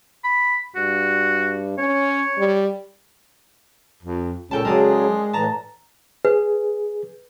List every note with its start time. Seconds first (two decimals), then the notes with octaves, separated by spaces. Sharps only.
0.24 B5
0.75 G2 F#4
1.78 C#4 C#5
2.38 G3
4.03 F2
4.51 C#2 A#2 C#4 A4 G5 A5
4.65 C#3 F#3 G#3 A#4 D5 D#6
5.33 A2 E3 A5 A#5
6.25 G#4 B4